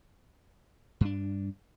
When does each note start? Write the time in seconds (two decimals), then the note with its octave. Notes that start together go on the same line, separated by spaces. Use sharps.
1.01 G2 D4